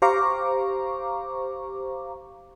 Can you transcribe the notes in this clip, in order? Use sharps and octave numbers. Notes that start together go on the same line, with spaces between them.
G4 C5 F5 A#5 C#6 D6